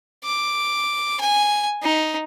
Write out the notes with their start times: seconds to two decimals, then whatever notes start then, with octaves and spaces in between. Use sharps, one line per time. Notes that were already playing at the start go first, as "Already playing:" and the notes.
0.25 D6
1.21 G#5
1.82 D#4